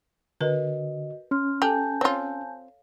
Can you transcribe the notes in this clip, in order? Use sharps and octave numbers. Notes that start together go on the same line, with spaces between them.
D3 F#4 A#4 B4 D#5
C#4 C6 F6
G4 A4 G#5 A5 G6
C4 F4 C#5 F5